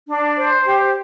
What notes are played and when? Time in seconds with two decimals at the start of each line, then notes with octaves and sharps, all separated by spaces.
0.07 D4
0.37 C5
0.65 G4